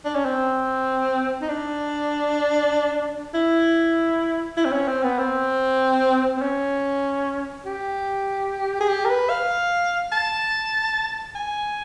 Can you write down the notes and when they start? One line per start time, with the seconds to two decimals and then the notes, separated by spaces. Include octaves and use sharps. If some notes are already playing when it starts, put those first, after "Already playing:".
0.05 D4
0.15 C#4
0.25 C4
1.41 D#4
1.49 D4
3.34 E4
4.57 E4
4.65 C4
4.72 C#4
4.88 C4
5.03 B3
5.19 C4
6.37 C4
6.42 C#4
7.65 G4
8.80 G#4
8.89 G4
9.05 A#4
9.09 B4
9.30 F5
10.12 A5
11.35 G#5